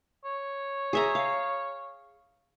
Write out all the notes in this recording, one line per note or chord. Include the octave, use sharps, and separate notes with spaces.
C#5
G#4 E5 A#5
F5